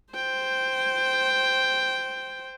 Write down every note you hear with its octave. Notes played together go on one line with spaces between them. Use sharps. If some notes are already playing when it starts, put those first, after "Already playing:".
C5 G5